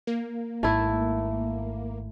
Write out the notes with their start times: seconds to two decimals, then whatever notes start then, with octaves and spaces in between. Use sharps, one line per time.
0.07 A#3
0.63 G#1 G#2 A3 E4